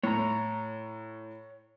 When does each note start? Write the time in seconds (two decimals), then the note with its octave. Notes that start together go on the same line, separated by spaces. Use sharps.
0.04 A2 C#5 A#5